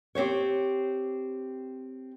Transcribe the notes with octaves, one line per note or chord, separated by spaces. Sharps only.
C4 G4 C5 C#5